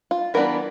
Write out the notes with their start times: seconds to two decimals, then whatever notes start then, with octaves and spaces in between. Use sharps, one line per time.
0.11 F4
0.34 E3 G3 B3 D4 A#4